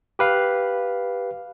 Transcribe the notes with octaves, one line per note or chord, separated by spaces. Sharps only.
G4 B4 F5